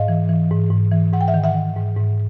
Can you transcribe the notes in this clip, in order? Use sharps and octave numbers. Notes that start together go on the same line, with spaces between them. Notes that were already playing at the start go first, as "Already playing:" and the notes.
Already playing: G#2 D#5 F5
E3
E3
G#2
G#2
E3
G#2 F#5
G5
E5 F#5
D#3
E5 F#5
D#3
G#2
G#2